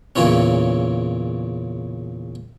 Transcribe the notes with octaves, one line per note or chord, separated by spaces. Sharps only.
E2 A#2 C#3 E3 C#4